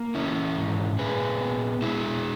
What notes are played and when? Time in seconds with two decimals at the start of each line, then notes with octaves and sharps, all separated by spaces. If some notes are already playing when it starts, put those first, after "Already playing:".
Already playing: A#3
0.15 E3 C#4 E4
0.57 G#2
0.99 A#2 G#4 B4
1.41 B3
1.82 G#3 E4 G#4